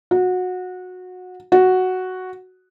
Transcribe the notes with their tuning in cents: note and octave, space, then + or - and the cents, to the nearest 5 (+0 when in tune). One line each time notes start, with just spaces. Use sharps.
F#4 -20
F#4 +0